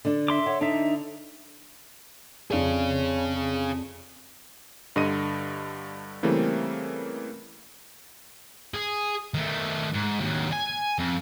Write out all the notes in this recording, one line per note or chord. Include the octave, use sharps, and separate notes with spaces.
D3 D4
E5 C6 D6
C#5 F#5
D3 D4 D#4 E5
F2 G#4 C#5 D5
G2 D3 D#5 A#6 D#7
C#3 E3 G3 A3 A#3 C4
G#4
D#3 A3
G#2
D#2 F#3
G#5
F2